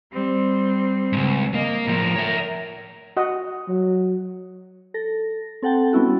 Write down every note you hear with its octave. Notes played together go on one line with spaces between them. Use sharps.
G3 C4
C#2 G#2
A#3 D#5
A2 F3 A#4
C#5 E5
F#4 D#5 F#5
F#3
A4 A#6
C4 A4 F#5 G5 A5
G3 B3 C#4 E4 F#4